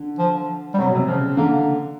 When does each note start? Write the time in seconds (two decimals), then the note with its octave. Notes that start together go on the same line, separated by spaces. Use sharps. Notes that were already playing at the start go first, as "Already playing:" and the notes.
Already playing: D3
0.19 F3
0.74 G3
0.78 C3 F#3
0.87 B2
0.95 C3
1.07 C#3 F3
1.37 D3 A#3